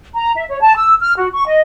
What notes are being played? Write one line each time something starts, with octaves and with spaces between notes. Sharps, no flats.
A#5
E5
C#5
A5
E6
F6
F#4
C#6
D#5